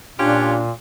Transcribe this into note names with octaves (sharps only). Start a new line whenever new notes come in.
A#2 C#4 D4 F4 G4